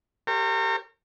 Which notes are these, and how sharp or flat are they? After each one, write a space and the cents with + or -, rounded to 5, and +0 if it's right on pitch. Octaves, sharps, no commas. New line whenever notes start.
G4 +0 A#4 -35 C#5 -35